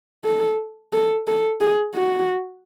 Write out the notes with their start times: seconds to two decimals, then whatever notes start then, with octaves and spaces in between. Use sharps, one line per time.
0.25 A4
0.93 A4
1.28 A4
1.61 G#4
1.95 F#4